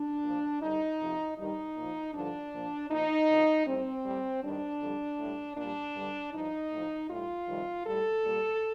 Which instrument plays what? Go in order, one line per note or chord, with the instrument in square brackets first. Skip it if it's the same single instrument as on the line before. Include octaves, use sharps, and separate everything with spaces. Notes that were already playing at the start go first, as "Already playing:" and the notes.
Already playing: [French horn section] D4
A#2 F3
G2 D3 G3 D#4
F2 C3 F3
G2 D#3 G3 D#4
A#2 F3
G2 D3 F3 D4
A#2 F3
A#2 F3 D#4
F2 D3 F3
A2 G3 C4
A2 G3
G2 D#3 G3 D4
F2 D3 G3
A2 G3
A#2 G3 D4
G2 D3 G3
G2 F3 D#4
A2 F3
A2 G3 F4
F2 C3 D#3 G3
A2 G3 A4
A#2 G3